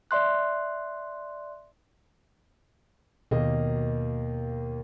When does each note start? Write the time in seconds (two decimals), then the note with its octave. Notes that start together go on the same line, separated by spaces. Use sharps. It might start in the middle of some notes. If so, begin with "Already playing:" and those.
0.11 D5 E5 C6 F#6
3.31 D#2 B2 A#3 D#5